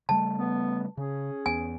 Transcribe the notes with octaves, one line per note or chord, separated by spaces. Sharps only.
C#3 G3 A3 A5
B3
C#3 C#4 G#4
E2 B3 G#5